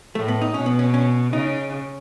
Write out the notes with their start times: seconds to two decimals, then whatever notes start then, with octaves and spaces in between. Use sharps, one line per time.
0.15 A2 A3
0.28 B3
0.41 D#4
0.54 B2 C#4
0.66 B3
0.79 C#4
0.94 C#4
1.33 C#3 D#4